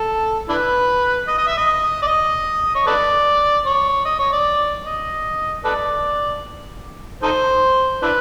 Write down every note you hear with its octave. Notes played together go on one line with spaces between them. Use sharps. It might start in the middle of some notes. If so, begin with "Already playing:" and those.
Already playing: A4
D4 E4 B4
D#5
D#5
E5
D#5
D5
D#5
C#5
A4 B4 D5
C#5
D#5
C#5
D5
D#5
A4 B4 D5
D#4 A4 C5
D4 E4 B4